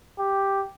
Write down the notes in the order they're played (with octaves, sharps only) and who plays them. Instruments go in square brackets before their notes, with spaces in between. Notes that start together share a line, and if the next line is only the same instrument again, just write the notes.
[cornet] G4